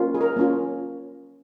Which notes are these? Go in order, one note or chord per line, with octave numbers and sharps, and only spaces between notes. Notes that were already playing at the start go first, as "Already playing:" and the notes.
Already playing: A#3 C#4 F4
G#4
A#4
A#3 C#4 F4